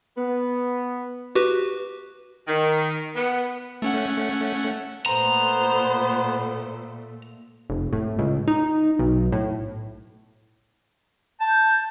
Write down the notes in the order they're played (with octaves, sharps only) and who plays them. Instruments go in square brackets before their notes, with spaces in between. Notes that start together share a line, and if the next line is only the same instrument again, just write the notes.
[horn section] B3
[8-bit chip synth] F#4 G4 B4
[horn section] D#3
B3
[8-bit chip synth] A3 C#4 F#5
[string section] A#2 A3 [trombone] B3 [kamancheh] C5 [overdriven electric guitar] A#5
[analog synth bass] F1
A2
C#2
D#4
B1
A2
[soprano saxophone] A5 [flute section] G6